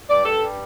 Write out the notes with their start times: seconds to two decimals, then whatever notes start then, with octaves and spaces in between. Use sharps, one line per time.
0.09 G2 D5
0.26 A4
0.42 G3